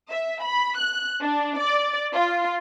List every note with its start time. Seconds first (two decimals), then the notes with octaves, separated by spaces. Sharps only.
0.11 E5
0.43 B5
0.78 F#6
1.21 D4
1.59 D5
2.13 F4